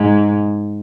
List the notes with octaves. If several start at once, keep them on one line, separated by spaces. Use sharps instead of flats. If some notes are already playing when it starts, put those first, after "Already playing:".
Already playing: G#2